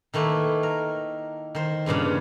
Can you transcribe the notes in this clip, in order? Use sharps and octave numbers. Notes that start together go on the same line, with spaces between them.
D#3 A3 A#3 E4 B4
A#4
D#3 C5
E2 G2 A#2 C#3